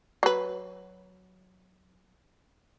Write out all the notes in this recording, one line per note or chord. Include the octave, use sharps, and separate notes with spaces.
F#3 B4